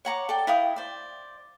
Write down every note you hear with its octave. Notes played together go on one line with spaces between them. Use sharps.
C#5 F#5 A#5 D6
A4 D5 G5
E4 F5 G5 D#6
C5 D5